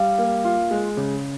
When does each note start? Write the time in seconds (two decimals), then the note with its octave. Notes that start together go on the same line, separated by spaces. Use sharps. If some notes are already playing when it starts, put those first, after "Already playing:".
Already playing: G3 F5
0.18 A#3
0.45 F4
0.71 G#3
0.97 C#3